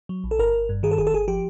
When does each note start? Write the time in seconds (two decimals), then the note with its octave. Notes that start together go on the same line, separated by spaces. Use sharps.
0.09 F#3
0.24 A#1
0.31 A4
0.39 G1 A#4
0.53 G1
0.69 G2
0.83 D#3 G#4
0.91 A4
0.98 G1 G#4
1.07 A4
1.13 G1 G#4
1.28 F3 G4